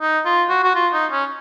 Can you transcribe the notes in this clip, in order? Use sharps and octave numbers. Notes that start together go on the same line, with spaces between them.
D#4
F4
F#4
F#4
F4
D#4
C#4